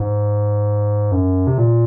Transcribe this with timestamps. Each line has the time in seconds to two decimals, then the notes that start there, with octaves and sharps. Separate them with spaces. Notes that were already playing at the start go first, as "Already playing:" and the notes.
Already playing: G#2
1.12 F#2
1.47 C3
1.58 A#2